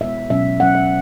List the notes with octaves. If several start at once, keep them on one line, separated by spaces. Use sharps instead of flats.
B2 G#3 B3 E5
B2 F#3 C#4 E5
B2 F#3 C#4 F#5
E5